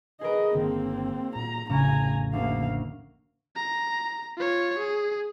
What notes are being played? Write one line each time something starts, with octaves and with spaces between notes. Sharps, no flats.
G#4 A#4 B4 D#5
G1 D3 D#3 A#3 C4
A#2 A#5
A1 F2 A2 C#3 G#5 A#5
D2 A#3 F5
A#5
F4 C#5
G#4